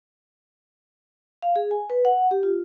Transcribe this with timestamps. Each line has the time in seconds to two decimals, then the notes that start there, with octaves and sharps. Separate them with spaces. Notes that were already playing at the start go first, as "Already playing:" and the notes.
1.42 F5
1.56 G#4
1.71 G#5
1.90 B4
2.05 F#5
2.31 G4
2.43 F4